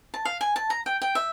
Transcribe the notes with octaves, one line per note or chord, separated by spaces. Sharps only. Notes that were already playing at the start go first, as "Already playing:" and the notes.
A5
F5
G#5
A5
A#5
G5
G5
E5